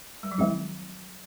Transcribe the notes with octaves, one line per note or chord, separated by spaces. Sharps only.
G3
F#3
D#3 F3 G#3 C4 E4